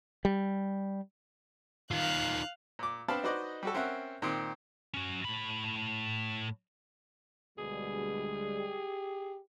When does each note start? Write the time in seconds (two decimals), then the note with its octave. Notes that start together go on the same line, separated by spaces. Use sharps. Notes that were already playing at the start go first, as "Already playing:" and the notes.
0.25 G3
1.91 D#3 F4 F5 F#6
2.79 A#2 D6
3.08 B3 C4 D4 F5 A5 B5
3.23 D#4 F#4 B4 C5 D5 D#5
3.63 G3 F#4 A4
3.74 C4 C#4 A#4 E5 F#5
4.22 A#2 D#3 C4
4.94 C#4 F#4
5.25 A2 B5
7.58 D2 B2 G3 G#3 G#4
8.58 G4